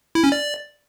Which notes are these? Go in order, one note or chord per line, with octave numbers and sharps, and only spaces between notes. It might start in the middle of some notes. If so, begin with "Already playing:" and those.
E4
C#4
D5